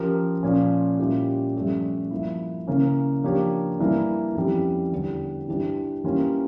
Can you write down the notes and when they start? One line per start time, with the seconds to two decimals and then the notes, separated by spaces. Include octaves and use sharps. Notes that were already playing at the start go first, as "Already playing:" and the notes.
Already playing: F3 C#4 G4 A#4
0.43 A#2 F3 C#4
0.99 A#2 G3 C#4 E4 G4
1.55 G2 F3 A3 C#4 G4
2.11 G2 F3 A#3 E4
2.67 C#3 E3 A#3 C#4
3.23 F3 A#3 D4 G4 C#5
3.79 G2 E3 A#3 E4
4.35 F2 E3 G3 C#4
4.92 E2 D3 G3
5.48 G2 E3 G3 D4
6.04 E3 G3 A#3 C#4 F4